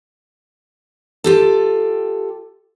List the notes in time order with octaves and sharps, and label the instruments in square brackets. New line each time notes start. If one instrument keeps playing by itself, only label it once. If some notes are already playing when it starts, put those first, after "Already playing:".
[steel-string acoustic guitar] F4 G4 A4